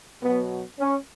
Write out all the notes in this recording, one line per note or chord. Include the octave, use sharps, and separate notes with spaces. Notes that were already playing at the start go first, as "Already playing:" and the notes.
B2 F#3 B3
C#4